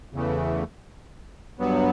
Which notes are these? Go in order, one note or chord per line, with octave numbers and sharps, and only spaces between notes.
E2 C#3 E3 A3
G2 F#3 B3